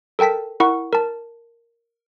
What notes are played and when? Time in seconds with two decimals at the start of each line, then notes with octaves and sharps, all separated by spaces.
0.19 A4 A#4 G5 A5 B6
0.60 E4 A#4 F#5 C#6
0.93 A#4 A5